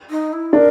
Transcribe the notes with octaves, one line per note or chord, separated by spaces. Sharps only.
D#4
E4
D4 A#4